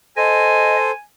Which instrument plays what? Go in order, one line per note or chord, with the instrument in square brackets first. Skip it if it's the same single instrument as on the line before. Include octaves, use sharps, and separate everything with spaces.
[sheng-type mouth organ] A4 C5 [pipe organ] D#5 [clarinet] G#5